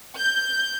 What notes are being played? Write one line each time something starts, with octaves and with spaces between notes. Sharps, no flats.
G6